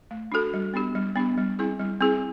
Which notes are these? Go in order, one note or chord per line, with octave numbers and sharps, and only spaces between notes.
A3
D4 F#4 A4
G3
B3 D4 G4
G3
B3 D4 G4
G3
C4 E4 G#4
G3
C4 E4 G#4